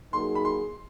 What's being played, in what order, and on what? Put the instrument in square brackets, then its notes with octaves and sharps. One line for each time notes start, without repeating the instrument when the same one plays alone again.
[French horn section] F#3 A#3 D#4 G#4 [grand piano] C6
[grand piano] B5
C6